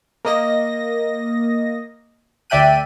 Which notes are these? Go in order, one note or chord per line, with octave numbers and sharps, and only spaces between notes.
A#3 D#5 A#6
D2 D5 E5 G5 F#6 D#7